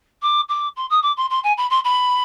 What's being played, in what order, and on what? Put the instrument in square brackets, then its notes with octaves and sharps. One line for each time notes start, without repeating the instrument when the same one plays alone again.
[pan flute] D6
D6
C6
D#6
D6
C6
C6
G#5
B5
C6
B5